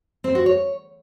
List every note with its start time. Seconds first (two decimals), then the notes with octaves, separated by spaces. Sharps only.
0.24 C4
0.35 F#4
0.46 C#5